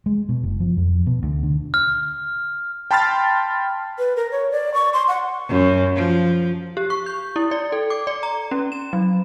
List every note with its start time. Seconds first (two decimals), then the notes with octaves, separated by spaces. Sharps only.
0.06 G#3
0.29 B2
0.43 F#1
0.60 F3
0.77 F2
1.07 B2
1.23 D2
1.43 D3
1.74 F6
2.91 G5 A5 B5 C6 F6 A6
3.99 B4
4.16 A#4
4.32 C#5
4.51 D5
4.74 C#6
4.93 C6
5.08 F#5
5.48 F#2
5.95 F3
6.77 G4
6.90 C#6
7.06 G6
7.36 E4
7.51 D5
7.72 A4
7.90 D6
8.07 D5
8.23 A#5
8.51 C#4
8.72 E7
8.93 F#3